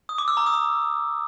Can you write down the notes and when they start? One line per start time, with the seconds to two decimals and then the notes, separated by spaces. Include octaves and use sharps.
0.09 D#6
0.18 D6
0.28 E6
0.37 A#5
0.46 D#6